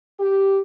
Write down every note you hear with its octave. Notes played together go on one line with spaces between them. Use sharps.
G4